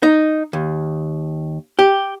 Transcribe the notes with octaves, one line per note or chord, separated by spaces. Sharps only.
D#4
D#2
G4